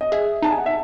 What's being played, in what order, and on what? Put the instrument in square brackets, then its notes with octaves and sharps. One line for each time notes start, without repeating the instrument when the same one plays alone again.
[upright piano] D#5
[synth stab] G#4 [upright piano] E5
[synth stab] D#4 [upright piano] A5
[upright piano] G#5
F#5
E5